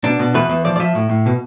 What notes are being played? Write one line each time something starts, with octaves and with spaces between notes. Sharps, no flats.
B2 D4
B2
E2 B4
E2
F3 D5
D5
F3 E5
A2
A2
B2